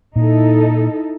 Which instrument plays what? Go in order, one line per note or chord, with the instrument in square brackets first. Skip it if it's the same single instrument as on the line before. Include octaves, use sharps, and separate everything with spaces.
[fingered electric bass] A#2 [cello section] D#4 E4 A4